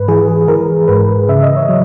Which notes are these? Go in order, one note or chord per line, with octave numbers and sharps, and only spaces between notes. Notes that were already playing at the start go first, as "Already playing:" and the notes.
Already playing: G#2 B4
E3 G#4
G#4
E3 A#4
G#2 B4
C#3 E5
D#5
C#5
F#3